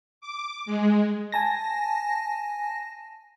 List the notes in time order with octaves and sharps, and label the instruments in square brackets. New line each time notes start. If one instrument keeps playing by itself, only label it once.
[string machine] D6
G#3
[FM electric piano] G#5 A5 A#6